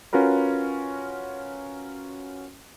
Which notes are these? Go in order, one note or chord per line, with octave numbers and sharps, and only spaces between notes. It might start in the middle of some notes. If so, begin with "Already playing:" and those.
C#4 F4 F#4 A#4 B4